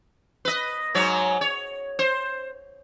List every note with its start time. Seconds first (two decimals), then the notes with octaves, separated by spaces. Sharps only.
0.45 B4 D#5
0.95 G#2 F#3 C#5
1.41 C#5
1.99 C5